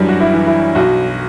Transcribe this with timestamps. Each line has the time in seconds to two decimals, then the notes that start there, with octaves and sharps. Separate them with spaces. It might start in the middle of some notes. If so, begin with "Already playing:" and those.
Already playing: F#2 E3 G3 D4
0.08 F#4
0.20 E4
0.33 E3
0.47 E4
0.75 B1 F#4